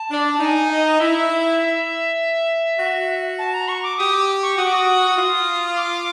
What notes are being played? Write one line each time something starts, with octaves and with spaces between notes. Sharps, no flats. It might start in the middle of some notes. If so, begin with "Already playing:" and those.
Already playing: A5
D4
D#4 A5
G#5
D#5
E4 E5
F#4
A5
A#5
C#6
D6
G4 D#6
D6
C#6
F#4 D#6
D6
D#6
F4
D6